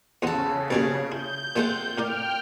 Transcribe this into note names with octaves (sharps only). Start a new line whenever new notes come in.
E2 C#3 G#3 B3 F#4 A4
B1 G2 A#2 G#4 C#5 D5
E4 G6
A#2 G#3 A3 C4 F4 F#5
A2 A#4 D5 G5 F6